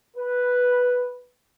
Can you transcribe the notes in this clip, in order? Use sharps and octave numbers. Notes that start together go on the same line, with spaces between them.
B4